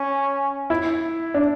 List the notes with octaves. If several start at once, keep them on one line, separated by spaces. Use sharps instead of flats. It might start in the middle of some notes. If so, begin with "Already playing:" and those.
Already playing: C#4
E4
D4